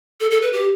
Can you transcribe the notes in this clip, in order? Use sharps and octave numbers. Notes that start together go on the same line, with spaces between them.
A4
A4
B4
G4